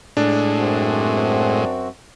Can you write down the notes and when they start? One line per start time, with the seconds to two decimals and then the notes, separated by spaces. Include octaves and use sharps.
0.17 A2 G#3 D4
0.58 F#2 C4 F#4